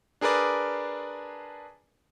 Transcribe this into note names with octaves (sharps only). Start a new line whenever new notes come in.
D4 G#4 A#4 B4 D5